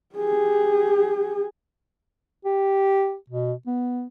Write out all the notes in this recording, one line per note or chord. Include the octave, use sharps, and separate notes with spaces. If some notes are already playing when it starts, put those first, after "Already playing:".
G4 G#4
G4
B2
B3